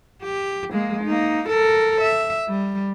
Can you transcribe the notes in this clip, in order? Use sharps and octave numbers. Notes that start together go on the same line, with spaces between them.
G4
G#3 A#3
A#3 D#4
A4 A#4
E5
G3